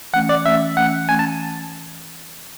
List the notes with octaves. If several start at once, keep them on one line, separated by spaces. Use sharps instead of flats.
E3 A3 C#4 F#5
D5
E3 A3 C#4 E5
E3 A3 C#4 F#5
E3 A3 C#4 G#5
A5